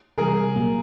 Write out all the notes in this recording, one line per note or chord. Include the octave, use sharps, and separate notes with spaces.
C3 E3 G3 G#4 A#4
A#2 F#3 A#3